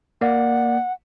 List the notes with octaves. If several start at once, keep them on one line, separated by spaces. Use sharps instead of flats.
A#3 D5 F#5